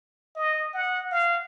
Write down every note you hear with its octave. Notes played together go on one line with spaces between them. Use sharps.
D#5
F#5
F5